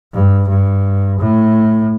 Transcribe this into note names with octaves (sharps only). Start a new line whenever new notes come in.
G2
G2
A2